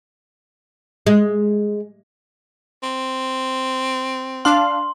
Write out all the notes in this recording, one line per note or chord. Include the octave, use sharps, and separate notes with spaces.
G#3
C4
D4 F5 C6